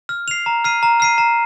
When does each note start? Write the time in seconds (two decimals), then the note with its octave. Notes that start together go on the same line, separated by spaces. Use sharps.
0.09 F6
0.28 C7 F7
0.46 A#5
0.64 F6 C7 D#7
0.83 A#5
1.00 F6 C7 D#7
1.18 A#5